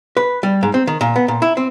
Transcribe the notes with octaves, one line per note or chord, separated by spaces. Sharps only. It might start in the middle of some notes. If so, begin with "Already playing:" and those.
B4
G3
G#2
C4
D#3
A#2
B3
A#2
E4
C4